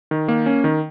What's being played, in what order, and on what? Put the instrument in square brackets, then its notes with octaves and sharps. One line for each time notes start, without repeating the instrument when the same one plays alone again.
[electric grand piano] D#3
A#3
C#4
D#3